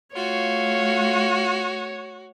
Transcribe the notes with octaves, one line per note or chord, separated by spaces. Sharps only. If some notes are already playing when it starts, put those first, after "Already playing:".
A3 F4 F#4 C#5